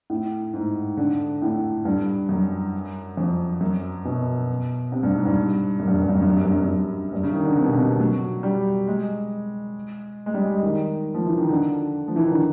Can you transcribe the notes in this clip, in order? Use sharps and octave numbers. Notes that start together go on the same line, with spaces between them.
A2
G#2
D3
A2
G2
F#2
F2
F#2
B2
C3
G2
G#2
G2
F#2
G2
F#2
G2
F#2
G2
F#2
G2
F#2
G2
F#2
G2
F#2
G2
C#3
D#3
D3
C3
B2
C3
F#3
G3
G#3
G#3
G3
G#3
D#3
F3
E3
D#3
D3
F3
E3
D#3
D3